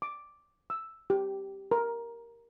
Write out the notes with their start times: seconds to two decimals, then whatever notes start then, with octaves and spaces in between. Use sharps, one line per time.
0.02 D6
0.70 E6
1.10 G4
1.71 A#4